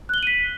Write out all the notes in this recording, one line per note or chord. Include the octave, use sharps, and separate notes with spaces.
F#6 B6 D#7 F#7 G7